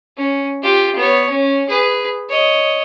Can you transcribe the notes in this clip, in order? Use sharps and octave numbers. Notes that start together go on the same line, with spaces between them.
C#4
F4 G4
B3 C#5
C#4
G#4 B4
C#5 D#5